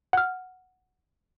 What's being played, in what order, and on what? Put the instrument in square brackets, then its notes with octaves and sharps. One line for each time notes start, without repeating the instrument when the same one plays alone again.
[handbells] F#5 F6